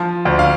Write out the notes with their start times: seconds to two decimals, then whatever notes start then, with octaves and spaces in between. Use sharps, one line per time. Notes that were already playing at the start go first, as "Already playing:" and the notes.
Already playing: F3
0.25 D2
0.39 F5